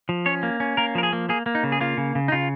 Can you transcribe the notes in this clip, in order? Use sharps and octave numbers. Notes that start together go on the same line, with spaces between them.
F3
C#4 C#5
A#3
C#4
A#3 A#4
F3 A#4
G#4
A#3
A#3 G#4
A#3
D#4
C#3
G#4
A#3 F4
C#3
C#3
D#4
C#3 F4